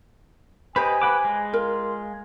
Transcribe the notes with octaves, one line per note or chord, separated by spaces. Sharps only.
G4 B4 C5 D#5 G#5 B5
B4 F#5 D6
G#3
F4 A#4